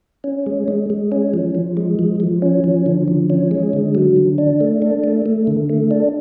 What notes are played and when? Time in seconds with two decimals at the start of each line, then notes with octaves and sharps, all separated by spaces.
0.24 C#4
0.46 G#3
0.68 G#3
0.90 G#3
1.12 C#4
1.34 F3
1.55 F3
1.77 G#3
1.99 F3
2.20 F3
2.42 C#4
2.64 F3
2.86 D3
3.08 F3
3.30 C#4
3.51 G#3
3.73 D3
3.95 F#3
4.16 D3
4.38 D4
4.61 A3
4.82 D4
5.04 A3
5.26 A3
5.47 D3
5.69 A3
5.91 D4